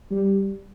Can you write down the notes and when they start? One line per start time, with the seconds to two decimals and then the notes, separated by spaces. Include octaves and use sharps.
0.11 G3